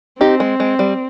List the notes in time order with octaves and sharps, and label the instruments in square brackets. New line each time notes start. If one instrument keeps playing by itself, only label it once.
[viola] C4 [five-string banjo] D#4 G4
[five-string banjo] G#3
G#3
G3